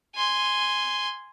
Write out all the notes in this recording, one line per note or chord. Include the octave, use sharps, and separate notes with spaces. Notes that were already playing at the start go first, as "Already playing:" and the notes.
G#5 C6